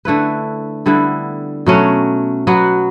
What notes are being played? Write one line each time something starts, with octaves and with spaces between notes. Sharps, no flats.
D3 A3 E4 B4
D3 G3 B3 E4
B2 F#3 A3 C#4
F#3 B3 F#4